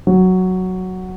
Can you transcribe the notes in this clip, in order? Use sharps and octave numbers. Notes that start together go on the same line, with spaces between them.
F#3